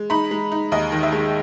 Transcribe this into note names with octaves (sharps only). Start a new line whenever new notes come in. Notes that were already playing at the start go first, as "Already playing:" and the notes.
Already playing: G#3
D#4 B5
G#3
D#4
D#2 D#5
D#3
E5
G#3